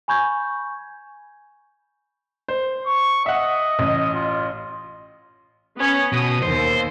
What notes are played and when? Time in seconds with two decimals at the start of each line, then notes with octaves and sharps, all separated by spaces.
0.08 G#5 B5 C#6 G6 G#6
2.48 C5
2.86 C#6
3.26 D#5 E5 F#5
3.79 A1
4.14 F4
5.77 B3 C#4
6.12 B2 D#6
6.43 D#2 C5